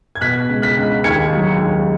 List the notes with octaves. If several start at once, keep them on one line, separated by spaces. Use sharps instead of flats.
G#6
B2 F#6 B6
C#2
F#6 B6
C#2
D#2 G#6 C#7
F#3
D#2